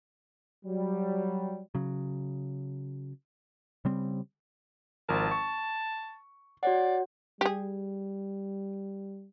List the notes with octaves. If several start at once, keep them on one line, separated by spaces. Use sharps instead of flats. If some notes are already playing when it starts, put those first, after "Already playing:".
F#3 G3
C#3 F#3
C#3 G3 C4
G#1 F3 A#4 A5
C#6
F#4 C#5 D5 F#5
G3 G4 G#4